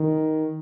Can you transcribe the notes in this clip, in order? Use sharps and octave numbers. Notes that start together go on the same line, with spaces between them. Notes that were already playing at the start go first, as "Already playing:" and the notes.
Already playing: D#3